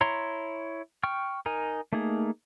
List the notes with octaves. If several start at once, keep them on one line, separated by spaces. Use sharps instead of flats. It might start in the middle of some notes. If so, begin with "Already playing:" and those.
E4 C#5 A#5 C6
G5 C#6 F6
D#4 A#4 G#5
A3 A#3 D#4 G#4